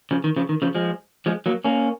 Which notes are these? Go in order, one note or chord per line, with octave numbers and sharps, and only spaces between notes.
C#3 F3
D#3
C#3 F3
D#3
C#3 F3
F3 G#3
F3 G#3
F#3 A#3
A#3 C#4